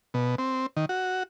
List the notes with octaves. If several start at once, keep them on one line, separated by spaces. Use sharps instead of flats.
B2
C4
D#3
F#4